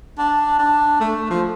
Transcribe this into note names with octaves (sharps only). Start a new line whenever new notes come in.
D4
D4
A3
F3